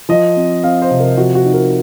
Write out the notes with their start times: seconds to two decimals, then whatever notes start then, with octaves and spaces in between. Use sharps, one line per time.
0.09 F3 D#5
0.37 C4
0.64 C4 F5
0.82 C5
0.91 C3
1.00 A#4
1.17 F3 F#4
1.35 F#4
1.45 D#4
1.54 A#4